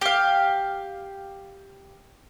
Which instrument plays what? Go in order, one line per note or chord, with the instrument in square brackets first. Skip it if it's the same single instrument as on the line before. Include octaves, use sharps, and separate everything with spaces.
[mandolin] G4 F5